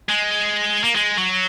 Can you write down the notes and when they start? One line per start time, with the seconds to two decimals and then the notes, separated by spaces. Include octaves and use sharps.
0.09 G#3
0.84 A#3
0.96 G#3
1.18 F#3